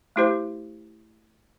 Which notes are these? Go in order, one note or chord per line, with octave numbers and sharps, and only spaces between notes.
A3 E4 G4 C5